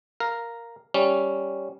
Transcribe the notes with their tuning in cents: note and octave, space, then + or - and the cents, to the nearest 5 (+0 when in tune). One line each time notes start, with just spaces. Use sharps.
A#4 +0 F5 +0
G3 +0 C#4 +0